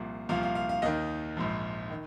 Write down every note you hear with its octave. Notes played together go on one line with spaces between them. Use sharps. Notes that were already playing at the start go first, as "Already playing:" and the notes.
Already playing: C2 A#2 F3
C2 A#2 F3 F5
F5
F5
F5
D#2 D#3 D#5
A#1 G#2 F3
D#3